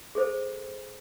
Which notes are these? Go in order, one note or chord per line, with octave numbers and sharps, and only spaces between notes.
G#4 A4 C5